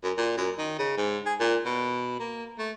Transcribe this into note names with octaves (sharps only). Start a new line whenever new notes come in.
F#2
A#2
F#2
D#3
C#3
G#2
G#4
A#2
B2
A#3
A3